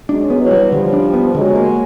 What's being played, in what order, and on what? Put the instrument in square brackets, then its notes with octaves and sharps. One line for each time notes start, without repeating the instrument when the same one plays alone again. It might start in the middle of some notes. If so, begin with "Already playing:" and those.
[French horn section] F#3 G#3 [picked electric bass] D4
[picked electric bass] B3
[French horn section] E3 F#3
[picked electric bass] G3
[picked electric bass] D3 [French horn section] F3 G3
[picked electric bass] D4
B3
[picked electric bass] D3 [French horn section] F#3 G#3
[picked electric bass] A#3